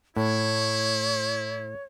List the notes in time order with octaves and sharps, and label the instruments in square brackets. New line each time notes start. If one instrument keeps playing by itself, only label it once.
[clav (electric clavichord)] A2 [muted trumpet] E4 [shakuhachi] C#5